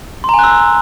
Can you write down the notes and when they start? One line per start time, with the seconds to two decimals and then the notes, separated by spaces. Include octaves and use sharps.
0.24 C6
0.29 A#5
0.34 G#5
0.39 F#6
0.44 E6